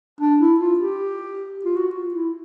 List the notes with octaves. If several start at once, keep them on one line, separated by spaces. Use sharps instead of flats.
D4
E4
F4
G4
F4
F#4
F4
E4